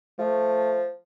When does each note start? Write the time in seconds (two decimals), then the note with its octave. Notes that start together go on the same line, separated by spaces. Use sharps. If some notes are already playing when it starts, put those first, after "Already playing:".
0.19 F3 A3